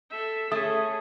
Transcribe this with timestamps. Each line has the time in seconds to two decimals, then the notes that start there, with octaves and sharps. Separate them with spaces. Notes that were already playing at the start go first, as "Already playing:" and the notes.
0.11 A4 E5
0.52 A3 C#4 G#4 D#6